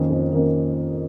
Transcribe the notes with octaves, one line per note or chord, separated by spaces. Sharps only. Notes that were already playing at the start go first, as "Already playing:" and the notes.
Already playing: F2 D#3 A#3 C#4
F2
D#3 A#3 C#4